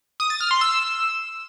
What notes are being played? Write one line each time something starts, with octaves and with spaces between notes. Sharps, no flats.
D#6
A6
F6
C6
E6